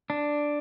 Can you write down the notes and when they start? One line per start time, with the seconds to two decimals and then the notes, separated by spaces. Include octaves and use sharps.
0.10 D4